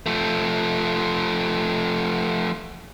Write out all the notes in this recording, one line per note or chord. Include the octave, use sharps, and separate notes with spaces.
F3 A3